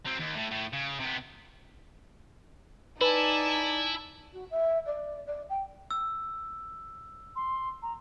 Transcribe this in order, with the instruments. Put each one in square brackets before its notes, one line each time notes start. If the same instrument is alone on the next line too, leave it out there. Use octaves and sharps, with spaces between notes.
[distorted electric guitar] F#3 C4
D#2
A2
A2
C#3
C3 B3
[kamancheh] D#4 D5 [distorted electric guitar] E4 [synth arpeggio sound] B4 [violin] G#5 A5
[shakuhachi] F#4
E5
D5
D5
G5
[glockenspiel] E6
[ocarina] C6
A#5